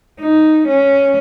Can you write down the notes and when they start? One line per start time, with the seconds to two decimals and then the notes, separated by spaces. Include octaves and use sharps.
0.21 D#4
0.68 C#4